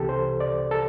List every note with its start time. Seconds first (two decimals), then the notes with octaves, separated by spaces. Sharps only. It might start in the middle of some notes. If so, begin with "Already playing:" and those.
Already playing: C2 C3 E3 G4 A4
0.09 C5
0.40 D5
0.71 A4